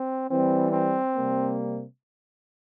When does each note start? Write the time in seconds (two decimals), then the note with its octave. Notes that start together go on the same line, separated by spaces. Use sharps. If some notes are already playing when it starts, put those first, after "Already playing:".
Already playing: C4
0.30 E3 G3 C4
0.73 C4
1.16 C3 G3 A#3